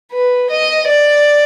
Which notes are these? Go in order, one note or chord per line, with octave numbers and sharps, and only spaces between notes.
B4
D#5
D5